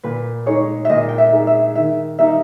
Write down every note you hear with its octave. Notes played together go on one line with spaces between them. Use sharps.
A#2 B4
G#3 D#4 G#4 C#5
E5
A#2 D#5
G5
E5
G#3 D#4 G#4
E5
D#3 E5
G3 A#3 D#4 E5